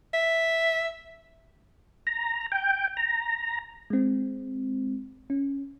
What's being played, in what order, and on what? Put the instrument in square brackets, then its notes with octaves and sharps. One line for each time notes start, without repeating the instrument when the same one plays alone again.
[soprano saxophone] E5
[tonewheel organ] A#5
G5
A#5
[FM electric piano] G#3 C4
C#4